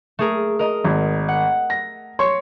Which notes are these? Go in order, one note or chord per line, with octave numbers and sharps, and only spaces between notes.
A3 G#4 A#4
A#4 D#5 A#5
G#1
F#5
A#6
C#5 C6 C#6